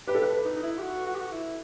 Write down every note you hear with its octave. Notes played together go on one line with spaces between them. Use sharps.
G4 B4
A4
B4
D#4
D#4
E4
G4
F#4
F#4
G4
F#4
E4